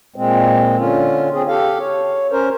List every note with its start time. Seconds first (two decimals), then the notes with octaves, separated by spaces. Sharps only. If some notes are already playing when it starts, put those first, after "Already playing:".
0.16 A#2 G#3 C4
0.77 D3 C#4 F4
1.33 C4 G#4
1.48 G4 A4 F5
1.80 C#5
2.32 C#4 A#4 C5